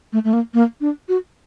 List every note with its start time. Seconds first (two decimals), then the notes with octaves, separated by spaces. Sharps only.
0.13 A3
0.24 A3
0.33 A#3
0.54 A#3
0.81 D4
1.09 F#4